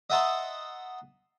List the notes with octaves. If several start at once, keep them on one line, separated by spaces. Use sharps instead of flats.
D#5 E5 F#5 A5 A#5 C6